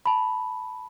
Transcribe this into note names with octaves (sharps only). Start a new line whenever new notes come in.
A5 B5